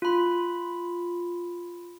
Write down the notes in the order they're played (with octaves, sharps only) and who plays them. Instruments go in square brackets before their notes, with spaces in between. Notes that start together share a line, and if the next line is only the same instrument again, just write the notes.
[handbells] F4 B5